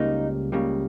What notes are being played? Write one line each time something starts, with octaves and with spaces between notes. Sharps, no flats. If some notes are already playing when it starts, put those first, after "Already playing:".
Already playing: C#2 C#3 G3 A#3 D#4
C#2 C#3 G3 A#3